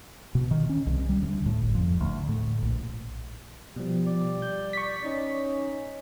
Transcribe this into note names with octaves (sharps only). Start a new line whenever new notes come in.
B2
D#3
C#4
C2
G3
D2
A2
G1
F2
D2
A2
A#1
B2 F3 G3
D5
G6
C#6 B6
C#4 D#4